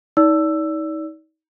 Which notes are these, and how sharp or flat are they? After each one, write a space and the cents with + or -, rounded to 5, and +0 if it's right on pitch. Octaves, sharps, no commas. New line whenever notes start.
D#4 +30 D5 -30 E6 +10